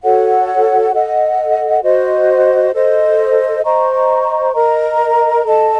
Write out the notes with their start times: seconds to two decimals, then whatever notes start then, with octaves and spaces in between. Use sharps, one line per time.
0.03 F#4 A4 C#5 F#5
0.92 A4 D#5 F#5
1.83 F#4 C5 D#5
2.73 A4 C5 D#5
3.63 C5 D#5 A#5 C#6
4.54 A#4 D#5 A#5
5.45 A4 D#5 A5